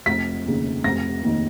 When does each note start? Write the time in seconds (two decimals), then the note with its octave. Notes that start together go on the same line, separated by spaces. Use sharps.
0.06 F1 B6
0.46 D#2 C#3
0.84 F1 A#6
1.23 D#2 D#3